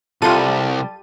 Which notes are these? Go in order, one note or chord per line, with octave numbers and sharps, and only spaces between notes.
C2 G3 F4 A4 D#7